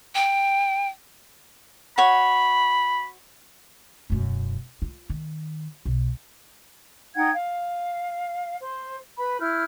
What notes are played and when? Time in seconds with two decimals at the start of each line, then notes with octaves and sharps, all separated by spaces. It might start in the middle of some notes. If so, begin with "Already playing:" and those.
0.15 G5
1.98 F#4 C#5 B5
4.10 E1 F#2
4.82 F4
5.10 D#3
5.86 B1
7.15 D#4 F#5 G5 G#6
7.33 F5
8.60 C5
9.17 B4 B5
9.40 E4 F6 G6